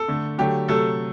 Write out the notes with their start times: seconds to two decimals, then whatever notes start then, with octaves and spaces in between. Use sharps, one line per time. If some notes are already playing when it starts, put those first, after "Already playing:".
Already playing: A4
0.08 D3 A3
0.38 D3 F#3 A3 G4
0.68 C3 F#3 A3 A4